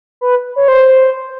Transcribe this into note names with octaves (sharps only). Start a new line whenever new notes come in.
B4
C#5
C5